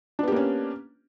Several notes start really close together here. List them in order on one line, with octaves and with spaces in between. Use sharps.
D4 B3 G4 A#3 C#4